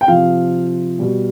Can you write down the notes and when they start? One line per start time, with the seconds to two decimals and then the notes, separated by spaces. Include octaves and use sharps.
0.01 G5
0.08 C3 F3 F5
0.99 B2 G3